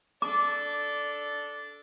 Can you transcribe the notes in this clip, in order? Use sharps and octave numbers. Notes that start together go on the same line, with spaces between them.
D4 A4 D6